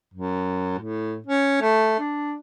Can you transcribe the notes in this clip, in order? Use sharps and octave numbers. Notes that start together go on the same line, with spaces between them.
F#2
A2
C#4
A3
D4